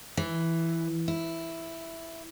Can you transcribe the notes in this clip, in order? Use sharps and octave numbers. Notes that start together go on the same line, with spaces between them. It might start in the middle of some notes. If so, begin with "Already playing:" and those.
E3
E4